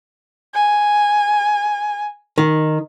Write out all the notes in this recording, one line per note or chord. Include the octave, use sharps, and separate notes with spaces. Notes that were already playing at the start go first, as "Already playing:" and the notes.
G#5
D#3